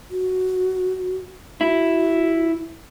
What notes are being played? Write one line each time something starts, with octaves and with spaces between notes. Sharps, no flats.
F#4
E4 F#4